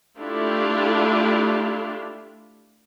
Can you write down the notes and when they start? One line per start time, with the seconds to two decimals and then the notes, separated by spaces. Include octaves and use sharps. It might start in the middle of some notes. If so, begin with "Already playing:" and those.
0.19 A3 D4 E4 F4 G4